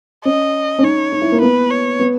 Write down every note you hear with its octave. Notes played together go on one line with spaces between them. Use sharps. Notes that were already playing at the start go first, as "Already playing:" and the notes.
C#4 D#5
C#4
D#4 C#5
D#4
E4
A#3
B3 B4
C#5
B3